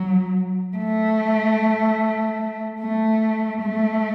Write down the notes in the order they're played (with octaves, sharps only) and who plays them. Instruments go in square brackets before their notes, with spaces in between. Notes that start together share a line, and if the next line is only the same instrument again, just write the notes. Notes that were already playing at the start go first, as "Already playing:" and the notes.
Already playing: [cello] F#3
A3
A3
A3